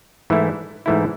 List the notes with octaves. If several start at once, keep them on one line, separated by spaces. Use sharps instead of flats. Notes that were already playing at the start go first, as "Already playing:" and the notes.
G#2 E3 A3 E4
G#2 E3 A3 E4